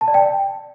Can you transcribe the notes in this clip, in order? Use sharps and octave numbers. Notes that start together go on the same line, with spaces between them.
A5
D5
G5